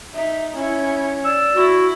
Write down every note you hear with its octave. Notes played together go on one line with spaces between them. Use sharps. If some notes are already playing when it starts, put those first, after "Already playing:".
D#4 E5
C#4 E4
D5 E6
E4 F#4